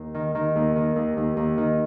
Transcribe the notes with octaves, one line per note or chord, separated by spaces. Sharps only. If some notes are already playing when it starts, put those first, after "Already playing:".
Already playing: D#2
D#3
D#3
D#2
D#3
D#2
D#2
D#2
D#3